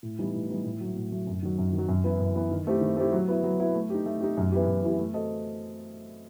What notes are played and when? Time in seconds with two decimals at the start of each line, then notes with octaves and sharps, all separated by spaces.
0.03 A2
0.19 E3 G3 B3 D#4
0.34 A2
0.50 E3 G3 B3 D#4
0.64 A2
0.81 F#3 A3
0.96 A2
1.12 F#3 A3
1.27 F#2
1.43 D#3 F#3
1.58 F#2
1.73 D#3
1.78 F#3
1.88 F#2
2.04 E3 B3 E4
2.19 F#2
2.35 E3 B3 E4
2.51 D#3
2.67 A3 C4 E4 G4
2.81 D#3
2.97 A3 C4 E4 G4
3.12 F#3
3.28 B3 E4
3.44 F#3
3.60 B3 E4
3.75 A3
3.90 D#4 G4
4.06 A3
4.21 D#4 G4
4.37 F#2
4.52 E3 B3 E4 G4
4.67 F#2
4.83 E3 B3 E4 G4
4.99 A3
5.14 C4 F#4 A4 D#5